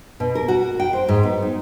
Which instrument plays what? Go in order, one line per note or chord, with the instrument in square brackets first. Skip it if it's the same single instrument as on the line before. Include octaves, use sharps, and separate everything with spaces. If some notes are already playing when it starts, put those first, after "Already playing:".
[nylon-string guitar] B2
A#4
F#4
G5
C5
G#2
B3
D#4